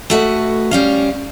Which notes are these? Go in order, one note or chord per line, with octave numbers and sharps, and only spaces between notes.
A3 F#4 B4 D#5
G3 C#4 F5